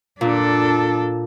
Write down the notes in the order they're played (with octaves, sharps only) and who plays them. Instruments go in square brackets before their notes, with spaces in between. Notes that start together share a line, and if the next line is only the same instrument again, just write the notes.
[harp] A#2 [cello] D4 A4